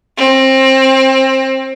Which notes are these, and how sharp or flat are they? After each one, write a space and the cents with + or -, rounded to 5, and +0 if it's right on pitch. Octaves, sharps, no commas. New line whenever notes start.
C4 +25